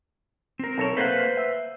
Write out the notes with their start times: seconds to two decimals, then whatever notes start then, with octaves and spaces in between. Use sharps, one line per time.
0.59 C4 A#4
0.78 B1 A4 C#5
0.97 A3 A#3 B4 C5 F#5
1.37 E5